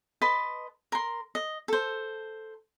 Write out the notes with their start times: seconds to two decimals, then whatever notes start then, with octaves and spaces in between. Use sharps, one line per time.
0.22 B4 D#5 A5 C6
0.92 A#4 C6
1.35 D#5
1.68 A4 C5